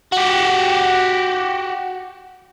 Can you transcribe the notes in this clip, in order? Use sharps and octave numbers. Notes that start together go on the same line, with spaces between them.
F#4 G4